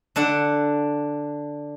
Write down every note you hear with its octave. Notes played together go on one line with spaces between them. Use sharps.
D3 D4 F#5